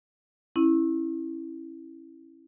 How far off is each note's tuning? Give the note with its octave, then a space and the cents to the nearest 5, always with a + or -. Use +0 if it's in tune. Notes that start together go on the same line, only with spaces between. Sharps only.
C#4 -30 E4 +0